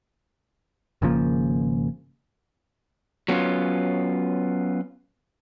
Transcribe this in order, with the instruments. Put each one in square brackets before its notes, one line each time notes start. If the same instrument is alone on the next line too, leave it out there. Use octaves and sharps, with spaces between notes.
[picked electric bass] G#1 C#3 F3 A#3
[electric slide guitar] F#3 B3 C#4 F4